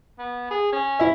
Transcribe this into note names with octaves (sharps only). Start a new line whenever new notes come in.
B3
G#4
C#4
E4 E5